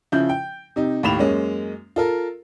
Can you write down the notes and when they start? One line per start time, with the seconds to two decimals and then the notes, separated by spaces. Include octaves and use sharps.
0.12 C#3 F3 E4 G6
0.29 G5
0.76 C3 D#4
1.03 D#2 A2 B5 E7 F7
1.19 F#2 G#3 A#3 C#4
1.96 F4 A4 A#4